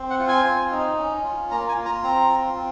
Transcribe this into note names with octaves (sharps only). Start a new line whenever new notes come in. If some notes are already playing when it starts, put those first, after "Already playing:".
Already playing: C4
F#5
F4
G#5
C4
D#4
C#4
F4
A#3 A#5
G#5
F4
A#5
C4 A#5
F4
C4